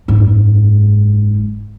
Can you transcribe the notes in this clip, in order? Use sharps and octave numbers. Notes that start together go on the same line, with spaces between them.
F#1 G#2